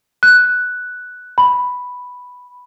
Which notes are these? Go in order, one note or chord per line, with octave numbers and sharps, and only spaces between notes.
F#6
B5